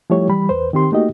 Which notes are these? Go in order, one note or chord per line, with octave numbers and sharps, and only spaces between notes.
F3 G3 A3 E4 G4 C#5
E3 G3 B5
E2 B4 C5
D#3 C4 G4 C6
A3 A#3 D#4 F#4 G4 D#5